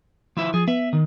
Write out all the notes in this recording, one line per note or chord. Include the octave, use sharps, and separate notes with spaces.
F3 E4 E5
F3 G#4
B3 E5
D#3